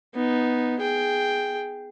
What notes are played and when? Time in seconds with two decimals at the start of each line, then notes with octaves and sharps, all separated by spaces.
0.15 B3 D#4
0.80 G#4 G5